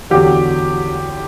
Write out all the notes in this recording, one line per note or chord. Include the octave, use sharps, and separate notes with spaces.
E2 D3 F#3 G4